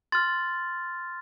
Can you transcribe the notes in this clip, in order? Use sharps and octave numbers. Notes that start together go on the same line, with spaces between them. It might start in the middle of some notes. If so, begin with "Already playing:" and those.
C6 F6 A6